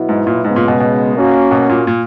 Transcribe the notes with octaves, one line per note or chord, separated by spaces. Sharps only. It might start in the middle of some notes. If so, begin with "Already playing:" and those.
Already playing: B2 F#3 B3 E4
G#2
A#2
G#2 C#3 G#3 B3
A#2
B2
B2
A#3 C#4 F#4
B2
A#2
A#2